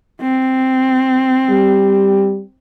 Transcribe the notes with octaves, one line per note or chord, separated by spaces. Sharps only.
C4
G3